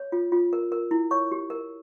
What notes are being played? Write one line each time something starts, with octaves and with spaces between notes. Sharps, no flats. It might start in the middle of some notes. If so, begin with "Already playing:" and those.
Already playing: C#5
F4
F4
A#4
A#4
E4
C#5 C#6
G4
A#4